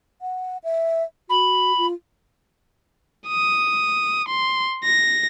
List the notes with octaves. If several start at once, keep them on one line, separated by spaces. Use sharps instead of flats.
F#5
E5
F#4 B5
F4
D#6
C6
A#6